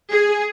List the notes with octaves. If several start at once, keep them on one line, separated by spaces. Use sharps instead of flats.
G#4